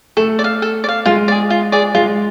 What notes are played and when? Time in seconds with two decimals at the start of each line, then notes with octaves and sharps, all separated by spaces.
0.17 A3 A4
0.39 D5
0.44 F5
0.62 A4
0.84 D5
0.89 F5
1.06 G#3 F4
1.28 G#4 D5
1.50 F4
1.72 G#4 D5
1.95 G#3 F4